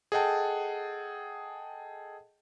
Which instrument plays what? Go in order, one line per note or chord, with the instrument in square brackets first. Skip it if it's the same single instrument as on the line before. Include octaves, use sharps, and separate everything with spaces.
[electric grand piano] G#4 A4 D#5 F#5 G5 A5